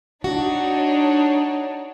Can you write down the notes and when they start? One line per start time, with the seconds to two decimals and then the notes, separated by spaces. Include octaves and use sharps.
0.24 D4 D#4 F#4 C#5